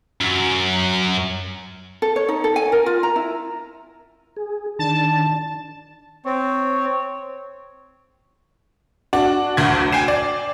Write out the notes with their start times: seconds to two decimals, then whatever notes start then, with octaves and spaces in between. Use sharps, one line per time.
0.21 F#2
2.02 A4
2.16 C#5
2.28 D#4
2.44 A4
2.56 G#5
2.72 A#4
2.86 F4
3.03 A#5
3.16 E4
4.37 G#4
4.79 D#3 D4 A5
6.25 C4 C#5
9.13 D4 F#4
9.57 F#1 D2 G#6
9.92 G5 G#5 C7 E7
10.08 D5